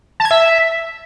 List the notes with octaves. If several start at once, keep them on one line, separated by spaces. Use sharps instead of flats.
A5
G#6
E5